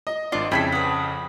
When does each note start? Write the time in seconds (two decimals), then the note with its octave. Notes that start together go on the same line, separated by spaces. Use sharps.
0.07 D#5
0.32 G#1 D4 F4 D5
0.51 F2 C#3 E4 G#4 A4 G5 G#6 B6
0.72 B4 F#5 D#6